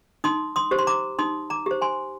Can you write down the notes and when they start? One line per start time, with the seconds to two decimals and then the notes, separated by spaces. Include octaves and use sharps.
0.24 D#4 C6 D#6
0.56 C6 D#6
0.71 G4 C5
0.79 C6
0.87 A#5 D6
1.19 D#4 C6 D#6
1.50 A#5 D6
1.66 G4 C5
1.82 G#5 C6